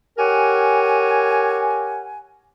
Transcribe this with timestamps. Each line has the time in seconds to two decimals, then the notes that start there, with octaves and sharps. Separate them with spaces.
0.18 G4 A#4 C#5 F#5 G#5